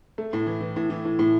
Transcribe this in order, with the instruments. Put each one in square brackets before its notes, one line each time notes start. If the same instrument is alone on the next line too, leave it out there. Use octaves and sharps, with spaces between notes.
[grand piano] A3
A2
E3
E3
A2
E3
A2
A2